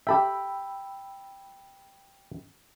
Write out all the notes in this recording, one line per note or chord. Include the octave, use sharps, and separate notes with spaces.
G4 A4 E5 G5 B5 E6